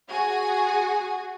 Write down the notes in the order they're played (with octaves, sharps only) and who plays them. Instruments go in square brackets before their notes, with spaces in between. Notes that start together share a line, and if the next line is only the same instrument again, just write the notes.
[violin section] F#4 G#4 G#5